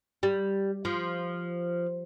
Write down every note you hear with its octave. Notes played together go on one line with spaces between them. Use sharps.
G3
F3